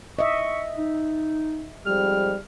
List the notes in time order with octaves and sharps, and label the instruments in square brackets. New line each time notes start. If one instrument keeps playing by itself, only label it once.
[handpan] D#5 E5 [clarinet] C#6
[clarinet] D#4
[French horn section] F2 G#2 G3 [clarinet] F6